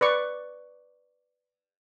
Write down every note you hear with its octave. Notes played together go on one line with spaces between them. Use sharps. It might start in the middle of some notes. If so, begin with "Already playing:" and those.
B4 D5 C#6